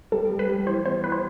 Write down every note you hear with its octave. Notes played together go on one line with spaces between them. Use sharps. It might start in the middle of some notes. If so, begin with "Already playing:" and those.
G3 A4
G3
B4
G3
E3 C5
B3 C5
E3 B4
C5